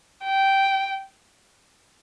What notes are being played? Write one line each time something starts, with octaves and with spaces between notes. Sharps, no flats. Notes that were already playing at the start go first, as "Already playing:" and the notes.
G5